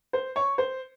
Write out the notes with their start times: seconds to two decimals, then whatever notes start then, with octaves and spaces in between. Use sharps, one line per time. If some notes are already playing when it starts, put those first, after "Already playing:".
0.13 C5
0.36 C#5
0.58 C5